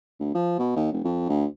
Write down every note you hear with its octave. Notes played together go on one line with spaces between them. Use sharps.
D2
F3
B2
D#2
F1
F2
D2